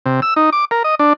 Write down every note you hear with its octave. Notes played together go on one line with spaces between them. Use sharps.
C3
E6
D#4
D6
A#4
D#5
D4